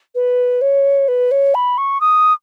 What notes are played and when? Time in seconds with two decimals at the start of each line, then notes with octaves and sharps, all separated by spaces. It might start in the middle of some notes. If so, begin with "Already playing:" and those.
0.15 B4
0.61 C#5
1.08 B4
1.31 C#5
1.55 B5
1.78 C#6
2.01 D#6